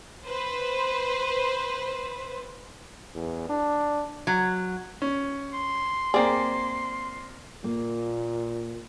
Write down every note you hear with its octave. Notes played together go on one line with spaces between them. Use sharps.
B4 C5
E2
D4
F#3
C#4
C6
A#3 C4 G#4 D5
A#2 A#3